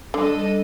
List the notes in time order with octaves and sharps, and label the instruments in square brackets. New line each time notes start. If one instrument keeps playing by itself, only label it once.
[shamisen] D3 [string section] G3 D4 A4 D#5